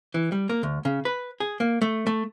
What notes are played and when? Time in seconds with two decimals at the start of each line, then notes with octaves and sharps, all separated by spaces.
0.14 E3
0.32 G3
0.49 A#3
0.63 D2
0.85 C#3
1.05 B4
1.40 G#4
1.60 A#3
1.82 A3
2.07 A3